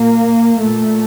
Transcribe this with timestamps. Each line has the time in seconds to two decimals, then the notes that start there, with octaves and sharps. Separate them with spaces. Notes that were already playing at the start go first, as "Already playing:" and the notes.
Already playing: A#2 A#3
0.58 A#2 A3